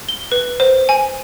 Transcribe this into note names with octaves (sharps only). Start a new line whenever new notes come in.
G7
B4
C5
G#5